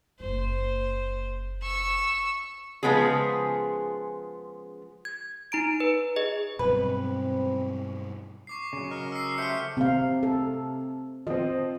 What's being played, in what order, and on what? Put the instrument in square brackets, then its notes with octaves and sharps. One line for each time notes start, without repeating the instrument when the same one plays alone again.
[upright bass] F#1 A#3 [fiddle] C5
[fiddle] C#6 E6
[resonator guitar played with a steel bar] C#3 F3 G#3 B3 C#4 G#4
[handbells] G#6
D#4 A#5 D7
B4
G#4 D#5
[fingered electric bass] G2 B2 F#3 [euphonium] C4 [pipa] B4
[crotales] C#6 D6 C7
[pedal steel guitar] C#3 F#3
[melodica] A#4 D#5 C#6
[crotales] E6 C7
[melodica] A3 G4 C5 [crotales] F6 B6 C#7
[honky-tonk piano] C3 [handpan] C4 F5
[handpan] A4
[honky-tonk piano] F3 C4 [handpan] D#5